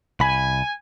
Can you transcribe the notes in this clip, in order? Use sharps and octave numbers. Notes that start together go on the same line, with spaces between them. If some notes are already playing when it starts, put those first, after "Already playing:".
C2 G#5 B5